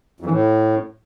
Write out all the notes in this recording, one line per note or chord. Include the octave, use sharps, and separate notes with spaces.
F2
E3
A2